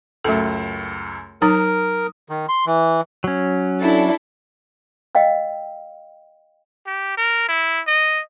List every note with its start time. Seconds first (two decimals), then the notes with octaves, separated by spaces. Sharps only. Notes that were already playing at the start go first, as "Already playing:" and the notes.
0.24 C#2 F#2 A3 A4
1.42 F#3 D#4 A#4 D#6
2.29 D#3
2.49 C6
2.66 E3
3.24 F#3 C#4
3.81 D4 E4 A4
5.15 D#5 F5 G5 E6
6.86 G4
7.17 A#4
7.48 E4
7.87 D#5